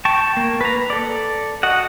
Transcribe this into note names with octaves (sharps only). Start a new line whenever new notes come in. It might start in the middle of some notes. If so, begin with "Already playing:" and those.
G5 A5 C#6
A#3
B4 A#5
A4 D5
F#4 D#5 F#5